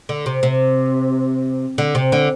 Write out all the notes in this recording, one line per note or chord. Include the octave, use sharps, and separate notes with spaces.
D3
C3
C3
D3
C3
D3